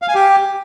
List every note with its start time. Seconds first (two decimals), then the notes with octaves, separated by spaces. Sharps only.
0.02 F5
0.08 G#5
0.15 G4